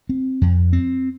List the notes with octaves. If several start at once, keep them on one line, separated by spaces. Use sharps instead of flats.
C4
F2
C4